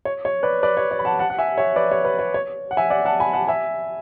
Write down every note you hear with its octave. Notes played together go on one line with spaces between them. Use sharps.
C#5
C#5
B4 D5
B4 D5
C#5
C#5
B5
F#5 A5
F#5 A5
F#5
E5 G#5
C#5 E5
B4 D5
C#5
B4
C#5
C#5
F#5
E5 G#5
D5 F#5
F#5 A5
G#5 B5
F#5 A5
E5 G#5